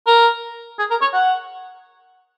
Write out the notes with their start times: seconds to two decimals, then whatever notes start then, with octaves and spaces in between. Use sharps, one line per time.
0.07 A#4
0.79 G#4
0.91 A#4
1.01 C#5
1.14 F#5